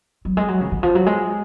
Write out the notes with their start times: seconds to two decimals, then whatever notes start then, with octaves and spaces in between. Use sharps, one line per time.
0.25 F#3
0.37 G#3
0.48 F#3
0.61 C#3
0.72 D#3
0.83 F3
0.95 F#3
1.06 G#3